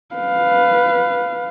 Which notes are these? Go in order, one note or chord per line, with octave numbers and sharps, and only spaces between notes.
B4 F5